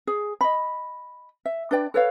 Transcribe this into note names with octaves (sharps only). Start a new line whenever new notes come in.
G#4
D#5 B5
E5
D4 B4 D5 G5
A4 B4 C#5 F5